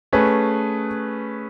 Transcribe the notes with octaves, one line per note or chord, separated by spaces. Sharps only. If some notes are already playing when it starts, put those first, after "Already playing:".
A3 C#4 G#4 B4